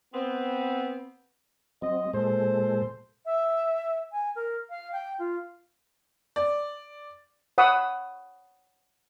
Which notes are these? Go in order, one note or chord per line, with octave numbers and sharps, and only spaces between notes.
B3 C4
F#3 C4 D#5
A#2 G#3 A4 C5
E5
G#5
A#4
F5
G5
F4
D5
C#5 F#5 B5 D#6 E6